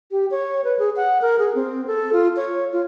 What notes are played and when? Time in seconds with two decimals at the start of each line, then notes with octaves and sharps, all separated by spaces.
0.11 G4
0.31 C#5
0.64 B4
0.79 G#4
0.96 F#5
1.22 A#4
1.39 G#4
1.55 C4
1.87 A4
2.13 F4
2.36 C#5
2.73 F4